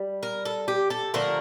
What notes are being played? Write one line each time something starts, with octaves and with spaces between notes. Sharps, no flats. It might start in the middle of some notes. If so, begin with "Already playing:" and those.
Already playing: G3
A#4
A4
G4
A4
D3 F3 A3 A#4